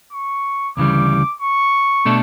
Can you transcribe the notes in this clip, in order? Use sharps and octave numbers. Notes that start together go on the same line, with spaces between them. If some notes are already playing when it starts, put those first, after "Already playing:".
C#6
D2 C#3 E3 G3 D6
C#6
B2 A3 D4 A4